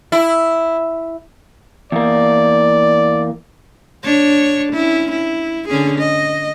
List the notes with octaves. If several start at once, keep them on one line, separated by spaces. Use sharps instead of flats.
E4
E2 A#3 D5
D4 C#5
C#4 E4
E4
D3 C#4 G#4
D#5